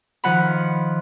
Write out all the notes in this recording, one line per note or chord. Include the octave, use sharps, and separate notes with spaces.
D#3 F3 F#5 B5